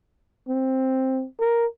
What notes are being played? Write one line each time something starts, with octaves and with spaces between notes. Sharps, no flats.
C4
A#4